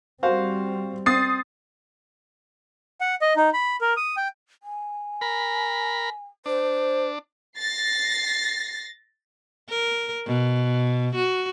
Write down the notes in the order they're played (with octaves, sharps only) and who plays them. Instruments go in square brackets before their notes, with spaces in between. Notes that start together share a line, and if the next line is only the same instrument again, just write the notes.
[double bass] G3 C4 [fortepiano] F#4 C5 F5
[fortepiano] C4 [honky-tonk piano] D#6 A6 C7
[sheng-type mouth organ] F#5
D#5
D#4
B5
A#4
D#6
G5
[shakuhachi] G#5
[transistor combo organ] A#4 B5
[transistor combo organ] D4 [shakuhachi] C5
[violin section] A6 A#6 C7
[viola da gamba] A#4
B2
F#4